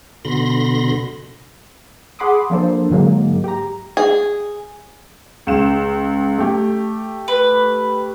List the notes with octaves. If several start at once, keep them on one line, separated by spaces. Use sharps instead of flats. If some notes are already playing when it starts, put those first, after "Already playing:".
B2 D3 B5 C6 A#6
G#4 F#5 B5 C6 D6 D#6
F3 A#3 D4 A4 C5
G#2 D3 F#3 G#3 A#3
G4 A#5
G#4
C#2 F5 E7
A3 G4
B4